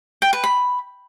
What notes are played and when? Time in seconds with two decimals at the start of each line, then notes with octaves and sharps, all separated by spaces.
0.22 G5
0.33 B4
0.44 B5